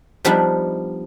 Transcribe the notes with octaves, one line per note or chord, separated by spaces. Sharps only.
F3 G3 B3 D4 D#4